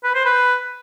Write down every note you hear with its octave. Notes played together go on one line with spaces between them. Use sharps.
B4
C5
B4